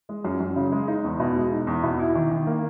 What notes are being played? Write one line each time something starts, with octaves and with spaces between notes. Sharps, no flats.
G#3
F#2
F#2
C#3
G#3
D#4
E2
B2
G#3
D#4
E2
B2
E4
D#3
D#3
A#3